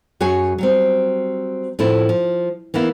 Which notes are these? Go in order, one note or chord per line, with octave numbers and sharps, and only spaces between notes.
F#2 F#4 G#4 C#5 G#5
F#3 G3 C4
A2 F3 A3 C4 E4
F3
E3 A#3 B3 E4